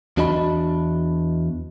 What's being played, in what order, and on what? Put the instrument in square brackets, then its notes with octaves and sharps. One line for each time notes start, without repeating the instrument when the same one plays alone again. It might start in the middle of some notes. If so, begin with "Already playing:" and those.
[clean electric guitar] E2 D4 F#4 D#5 A5 B5